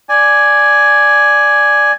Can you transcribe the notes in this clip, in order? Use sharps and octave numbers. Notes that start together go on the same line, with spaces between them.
D5 G#5